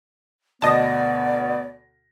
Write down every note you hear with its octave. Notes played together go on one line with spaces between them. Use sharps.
D2 B2 B3 D5 D#5 A5 A#6